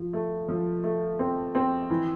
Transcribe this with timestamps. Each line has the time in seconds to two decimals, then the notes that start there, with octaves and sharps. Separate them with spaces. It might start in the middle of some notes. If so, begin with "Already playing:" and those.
Already playing: F3
0.13 A3
0.48 F3
0.84 A3
1.19 C4
1.55 C4
1.90 E3